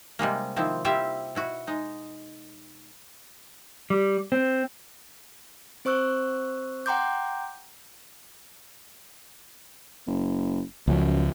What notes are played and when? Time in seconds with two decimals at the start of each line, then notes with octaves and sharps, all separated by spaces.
0.19 C3 G3 G#3 A#3
0.56 D#3 F3 C4 E4
0.85 G3 C4 E4 F4 G4 E5
1.35 B2 E4 F#4
1.67 G#3 D#4
3.90 G3
4.32 C4
5.85 C4 C5 C#6 E6 F#6
6.86 F#5 G5 A#5 C6 D6 G6
10.07 F#1
10.88 C#2 F#2 F3